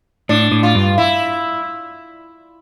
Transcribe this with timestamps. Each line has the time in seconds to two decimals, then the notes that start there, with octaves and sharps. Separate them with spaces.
0.29 A2 D4
0.52 A2
0.63 F4
0.75 G2
0.98 E4